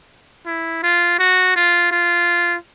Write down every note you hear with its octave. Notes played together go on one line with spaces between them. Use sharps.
E4
F4
F#4
F4
F4